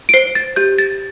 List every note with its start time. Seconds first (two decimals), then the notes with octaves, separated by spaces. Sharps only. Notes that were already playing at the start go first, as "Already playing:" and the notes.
0.09 D7
0.14 C5 C7
0.35 A6
0.56 G4 G6
0.78 A6